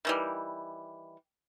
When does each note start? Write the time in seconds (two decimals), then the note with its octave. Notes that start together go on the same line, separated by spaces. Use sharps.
0.05 D#3 E3 G3